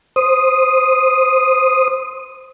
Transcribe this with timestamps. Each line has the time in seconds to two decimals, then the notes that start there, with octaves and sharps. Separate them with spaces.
0.16 C5 D#6